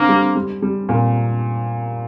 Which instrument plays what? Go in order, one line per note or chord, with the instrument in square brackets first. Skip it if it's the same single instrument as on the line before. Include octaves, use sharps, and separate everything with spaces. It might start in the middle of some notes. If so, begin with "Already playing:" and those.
Already playing: [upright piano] D3 C4 [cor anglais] A#3
[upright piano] G3
G3
G3
A#2